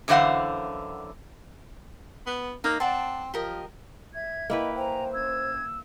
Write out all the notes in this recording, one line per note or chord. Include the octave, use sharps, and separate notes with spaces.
F#2 D3 E3 C5 F5 F#5
B3
A#3 D#4
C4 D5 F#5 A5
F3 G4 A#4 D#5
E5 G#6
A#3 E4 B4 D#5 G5
C5 G5 G#5 A#5
C#4 E6 G#6